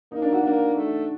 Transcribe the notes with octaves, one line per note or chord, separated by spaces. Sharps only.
A#3 D#4
D4
F#4
A#3 D4
A3